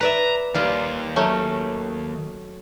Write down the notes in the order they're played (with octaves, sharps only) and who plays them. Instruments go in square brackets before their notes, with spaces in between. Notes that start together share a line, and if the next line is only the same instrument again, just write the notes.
[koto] B4 D5 E5 [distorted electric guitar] A#5
[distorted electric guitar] D#2 [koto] G3 F4 D5
[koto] F#3 A3 C#4